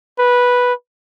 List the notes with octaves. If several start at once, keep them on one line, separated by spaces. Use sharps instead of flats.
B4